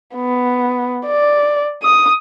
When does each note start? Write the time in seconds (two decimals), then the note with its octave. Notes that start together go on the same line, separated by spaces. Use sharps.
0.15 B3
1.06 D5
1.82 D#6